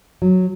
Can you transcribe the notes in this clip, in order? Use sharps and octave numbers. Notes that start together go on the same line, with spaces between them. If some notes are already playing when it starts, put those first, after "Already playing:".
F#3